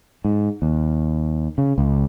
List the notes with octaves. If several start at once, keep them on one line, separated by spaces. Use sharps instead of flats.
G#2
D#2
C#3
C#2